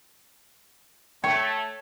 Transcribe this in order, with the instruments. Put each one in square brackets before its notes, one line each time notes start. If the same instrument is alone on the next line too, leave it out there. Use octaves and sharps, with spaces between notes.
[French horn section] A3 [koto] C#5 [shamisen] G5